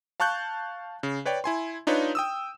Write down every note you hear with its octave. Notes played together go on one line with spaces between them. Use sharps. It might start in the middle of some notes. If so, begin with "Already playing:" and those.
F5 A5 C#6 F#6 G6
C#3
B4 C#5 D5 G5
E4 G#5 C6
D4 D#4 F4 B4 C#5
G5 D#6 E6